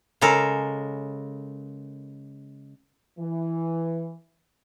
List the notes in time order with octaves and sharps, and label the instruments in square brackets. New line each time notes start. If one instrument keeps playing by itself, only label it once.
[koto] C#3 G#3 A4 A#4
[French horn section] E3